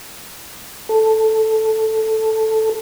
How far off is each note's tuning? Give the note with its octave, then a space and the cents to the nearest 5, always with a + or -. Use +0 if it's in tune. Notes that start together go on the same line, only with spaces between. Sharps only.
A4 +0